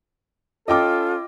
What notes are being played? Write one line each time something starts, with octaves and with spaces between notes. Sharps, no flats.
C#4 F4 A4 D#5 G5 D6